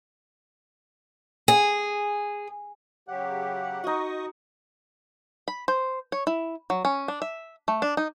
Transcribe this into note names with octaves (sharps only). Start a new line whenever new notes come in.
G#4
C#3 F#3 G4 F#5
D#4 F#4 D#5 C#6 D#6
B5
C5
C#5
E4
F#3
C#4
D4
E5
A3
D4
D#4